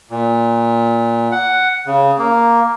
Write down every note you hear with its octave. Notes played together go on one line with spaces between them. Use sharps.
A#2
F#5
C#3
A#3